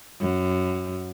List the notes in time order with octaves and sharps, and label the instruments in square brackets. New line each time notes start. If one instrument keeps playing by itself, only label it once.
[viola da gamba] F#2